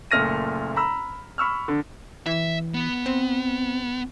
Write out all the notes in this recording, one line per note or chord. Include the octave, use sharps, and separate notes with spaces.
F#1 A#2 A3 F6 A#6 D#7
A#5 B5 E6
B5 C#6 E6 F6
D3
E3 E5
B3
C4